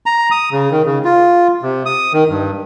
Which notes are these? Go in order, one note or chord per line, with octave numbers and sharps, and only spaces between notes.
A#5
D#6
C#3
D#3
C#3
F4
C3
D#6
D#3
G2